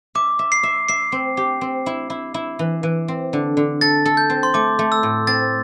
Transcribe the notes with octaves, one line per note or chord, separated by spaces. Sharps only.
E5 D6
E5
C7
E5
E5 C7
C4
G4
C4
E4
E4
E4
E3
E3
C4
D3
D3
A4 A6
A4
G6
C4
C6
A3 D6
A3
E6
A2
C4 A6